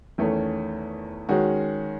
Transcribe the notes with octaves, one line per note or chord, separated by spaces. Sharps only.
E2 D#3 A3 C#4
D#3 G#3 C#4 F#4